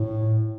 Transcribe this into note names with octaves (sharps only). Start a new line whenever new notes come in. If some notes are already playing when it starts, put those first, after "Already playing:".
Already playing: A2